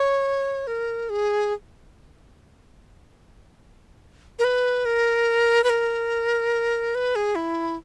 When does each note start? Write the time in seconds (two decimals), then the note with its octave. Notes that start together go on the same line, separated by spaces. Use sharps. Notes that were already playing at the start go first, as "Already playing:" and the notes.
Already playing: C#5
0.67 A#4
1.10 G#4
4.39 A#4
4.44 B4
4.85 A#4
5.64 B4
5.70 A#4
6.95 B4
7.16 G#4
7.35 E4